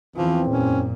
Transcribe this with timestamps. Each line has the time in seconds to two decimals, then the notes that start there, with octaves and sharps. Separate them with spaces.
0.16 E2 E3 F3 C4
0.51 F#2 A#2 C#4